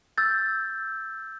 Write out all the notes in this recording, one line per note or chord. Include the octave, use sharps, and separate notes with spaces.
E6 G6 A6